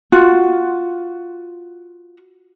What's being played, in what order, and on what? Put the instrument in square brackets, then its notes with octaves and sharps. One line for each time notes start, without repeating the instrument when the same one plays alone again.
[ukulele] F4 F#4